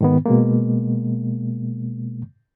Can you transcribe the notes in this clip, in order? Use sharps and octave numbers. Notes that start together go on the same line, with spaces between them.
G#2 D#3 B3
B2 G#3 A#3